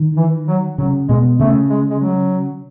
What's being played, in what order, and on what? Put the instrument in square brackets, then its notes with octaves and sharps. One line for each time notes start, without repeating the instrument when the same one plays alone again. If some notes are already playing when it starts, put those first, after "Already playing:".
Already playing: [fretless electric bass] D#3
[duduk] E3
F#3
[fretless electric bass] C#3 [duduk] F#3
[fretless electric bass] B2 [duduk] G#3
[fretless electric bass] C#3 [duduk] A3
[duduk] G#3
G#3
F#3